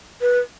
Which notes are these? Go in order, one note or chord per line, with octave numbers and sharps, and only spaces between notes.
B4